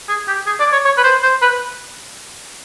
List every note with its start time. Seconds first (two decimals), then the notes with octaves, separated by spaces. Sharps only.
0.09 G#4
0.28 G4
0.47 G#4
0.60 D5
0.72 C#5
0.85 C#5
0.97 B4
1.04 C5
1.23 C5
1.42 B4